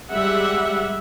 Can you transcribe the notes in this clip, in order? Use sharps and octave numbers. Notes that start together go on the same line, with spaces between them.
G3 G#3 E5 F#5